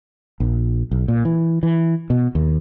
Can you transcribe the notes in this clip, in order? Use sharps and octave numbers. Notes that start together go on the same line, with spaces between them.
A#1
B1
A#2
E3
E3
B2
D#2